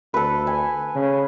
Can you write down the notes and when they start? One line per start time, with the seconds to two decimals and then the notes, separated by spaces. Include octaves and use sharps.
0.14 D2 A4 B4
0.47 G#5
0.95 C#3